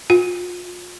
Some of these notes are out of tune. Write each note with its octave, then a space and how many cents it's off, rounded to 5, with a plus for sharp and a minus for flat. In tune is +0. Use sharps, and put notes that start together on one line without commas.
F4 +35